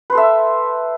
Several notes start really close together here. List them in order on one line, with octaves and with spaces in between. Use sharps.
B4 C5 A4 E5